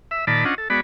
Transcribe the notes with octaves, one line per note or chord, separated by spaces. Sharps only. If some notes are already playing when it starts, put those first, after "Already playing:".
E5
A#2 D#3 D5 A5 B5
C#4 D4 F4 D#5 F#5
A4
G#3 B3 F#4 D5 B5